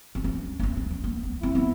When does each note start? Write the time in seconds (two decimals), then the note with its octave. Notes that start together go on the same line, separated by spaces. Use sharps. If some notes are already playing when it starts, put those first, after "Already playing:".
0.15 C4
0.24 C#4
0.60 D4
0.63 C#4
0.77 C4
0.91 C#4
1.04 A#3
1.23 B3
1.42 C4 E4
1.55 B3